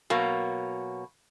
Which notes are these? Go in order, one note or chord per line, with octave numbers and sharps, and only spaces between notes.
B2 F#3 A#3